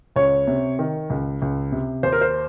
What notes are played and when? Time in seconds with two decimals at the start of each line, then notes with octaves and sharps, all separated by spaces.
0.16 C#2 C#5
0.47 C3
0.79 D#3
1.10 C#2
1.42 C#2
1.72 C3
2.03 D#2 C5
2.13 A#4
2.21 C5